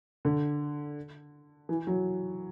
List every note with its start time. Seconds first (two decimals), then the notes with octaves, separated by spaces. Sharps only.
0.25 D3
1.69 E3
1.87 F#3